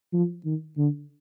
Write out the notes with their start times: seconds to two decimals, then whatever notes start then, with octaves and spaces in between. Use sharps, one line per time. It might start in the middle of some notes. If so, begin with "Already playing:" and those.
0.13 F3
0.45 D#3
0.77 D3